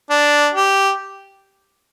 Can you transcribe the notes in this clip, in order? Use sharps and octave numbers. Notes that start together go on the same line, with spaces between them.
D4
G4